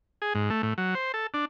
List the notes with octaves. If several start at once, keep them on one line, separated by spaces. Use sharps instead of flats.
G#4
G#2
A3
A2
F#3
C5
A4
D4